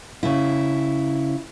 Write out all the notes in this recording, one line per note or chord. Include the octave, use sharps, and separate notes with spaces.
C#3 E4